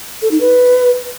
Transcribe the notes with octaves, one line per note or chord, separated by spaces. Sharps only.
A4
D#4
B4